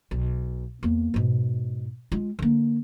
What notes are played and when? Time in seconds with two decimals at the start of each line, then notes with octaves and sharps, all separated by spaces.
0.11 B1
0.83 E2 A#3
1.14 G#2 B2
2.12 G#3 F4
2.39 D3 A#3